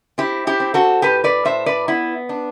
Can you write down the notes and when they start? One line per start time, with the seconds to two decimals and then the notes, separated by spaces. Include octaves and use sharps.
0.18 C4 E4 G4
0.47 E4 G4
0.60 C4
0.74 F#4 A4
1.02 A2 G4 B4
1.24 B4 D5
1.45 A2 C5 E5
1.66 B4 D5
1.88 B3 E4
2.29 D4